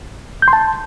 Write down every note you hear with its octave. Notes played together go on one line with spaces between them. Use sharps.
G6
C6
A5